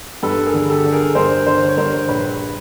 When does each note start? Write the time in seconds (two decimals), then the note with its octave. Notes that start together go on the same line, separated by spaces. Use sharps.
0.23 G2 A4 B4
0.46 G#4 A#4
0.54 D3
0.69 G4 A4
0.84 D3
0.92 G#4 A#4
1.15 G2 A#4 C5
1.46 D3 A#4 C5
1.68 C#5
1.77 G2 A#4 C5
2.08 A#1 B4 C#5